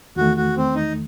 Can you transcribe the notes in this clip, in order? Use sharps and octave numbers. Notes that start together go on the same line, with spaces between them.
E2 D#3 A3 F#4
F#4
C4
D#4